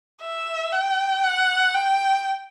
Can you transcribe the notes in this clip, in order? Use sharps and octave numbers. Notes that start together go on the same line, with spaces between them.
E5
G5
F#5
G5